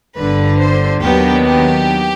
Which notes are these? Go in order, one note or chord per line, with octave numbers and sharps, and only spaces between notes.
G1 G2 D3 B4
C5
D#2 D#3 F#3 B3 D4 G4
G4